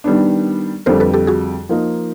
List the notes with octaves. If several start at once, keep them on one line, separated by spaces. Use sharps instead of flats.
D#3 G3 B3 D4
F2 D3 G3 A#4 C5
A4 B4
G4 A4
F#4 G#4
F3 A#3 D#4